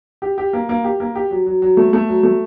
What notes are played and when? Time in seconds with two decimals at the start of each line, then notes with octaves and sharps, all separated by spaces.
0.22 G4
0.38 G4
0.53 A#3
0.69 A#3
0.84 G4
1.00 A#3
1.15 G4
1.31 F#3
1.46 F#3
1.62 F#3
1.77 A3
1.93 A3
2.08 F#3
2.23 A3